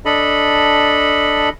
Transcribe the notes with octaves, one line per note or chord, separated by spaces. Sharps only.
D4 A4 D#5 B5